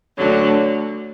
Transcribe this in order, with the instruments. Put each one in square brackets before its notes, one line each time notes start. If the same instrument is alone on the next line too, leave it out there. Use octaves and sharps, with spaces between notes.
[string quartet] D2 D3 F#3